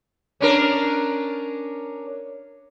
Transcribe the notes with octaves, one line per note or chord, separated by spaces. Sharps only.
C#4 D4 A#4